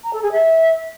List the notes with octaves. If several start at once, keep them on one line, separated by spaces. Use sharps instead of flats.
A#5
A4
G#4
E5